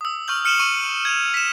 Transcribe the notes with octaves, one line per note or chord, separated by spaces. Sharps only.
D#6 E6
C#6 F6 G6 F#7
F6 C#7 D#7 E7 F#7 G7
C#6 D#7 F#7
G#6 E7 F7
B6 E7